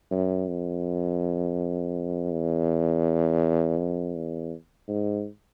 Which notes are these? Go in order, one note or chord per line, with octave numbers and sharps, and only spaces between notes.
F#2
F2
E2
F2
E2
G#2